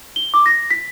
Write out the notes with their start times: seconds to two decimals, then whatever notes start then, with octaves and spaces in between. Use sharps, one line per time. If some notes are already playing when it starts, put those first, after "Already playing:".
0.16 G7
0.34 D6
0.46 A#6
0.71 B6